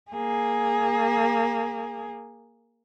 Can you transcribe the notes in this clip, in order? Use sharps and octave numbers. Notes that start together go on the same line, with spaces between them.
A#3 G#4